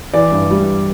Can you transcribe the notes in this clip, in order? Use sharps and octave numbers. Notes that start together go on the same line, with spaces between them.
E3 D5
G2
G3